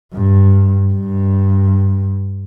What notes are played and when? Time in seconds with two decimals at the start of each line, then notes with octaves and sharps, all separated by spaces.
0.14 G2
0.93 G2